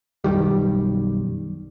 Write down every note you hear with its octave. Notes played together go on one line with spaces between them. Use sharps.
B1 F#2 D#3 G3